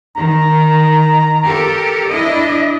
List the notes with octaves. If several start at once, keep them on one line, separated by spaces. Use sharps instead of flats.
D#3 A#5
G4 A4 A#4
D4 E4 D#5